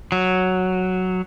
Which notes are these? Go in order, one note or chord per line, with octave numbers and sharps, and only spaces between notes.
F#3